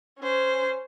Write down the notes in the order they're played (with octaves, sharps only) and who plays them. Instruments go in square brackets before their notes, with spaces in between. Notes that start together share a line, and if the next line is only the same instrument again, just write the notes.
[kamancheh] C#4 C5